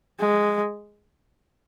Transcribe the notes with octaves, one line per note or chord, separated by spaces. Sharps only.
G#3